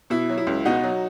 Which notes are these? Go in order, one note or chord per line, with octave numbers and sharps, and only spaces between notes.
B2 E4
F#3
E4
C#2
B2 D#4 F#4
F#3